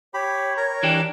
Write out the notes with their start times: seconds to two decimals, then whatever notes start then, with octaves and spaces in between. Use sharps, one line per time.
0.14 G4 C#5 B5
0.57 A#4 A#5
0.83 E3 D4 G4